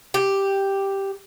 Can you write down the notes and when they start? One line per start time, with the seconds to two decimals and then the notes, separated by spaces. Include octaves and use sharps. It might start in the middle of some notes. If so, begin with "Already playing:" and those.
0.14 G4